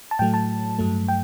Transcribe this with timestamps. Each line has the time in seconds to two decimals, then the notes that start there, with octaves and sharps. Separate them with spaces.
0.11 A5
0.19 A2 F#3 A3 G5
0.34 A5
0.79 G2 F#3 A3
1.08 G5